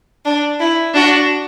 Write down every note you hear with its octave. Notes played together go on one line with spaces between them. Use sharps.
D4
E4
D4 F#4